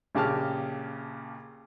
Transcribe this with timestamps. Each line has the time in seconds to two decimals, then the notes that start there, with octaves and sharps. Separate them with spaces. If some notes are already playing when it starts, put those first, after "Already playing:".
0.15 A#1 C#3 G4 A5 F6